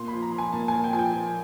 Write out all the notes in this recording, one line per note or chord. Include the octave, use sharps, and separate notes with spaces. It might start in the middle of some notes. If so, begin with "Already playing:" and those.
Already playing: A#2 C6
F3 B5
A#5
F3
G#5
A#2 A5
A#2 G#5
G5
F3 G#5
G5
F3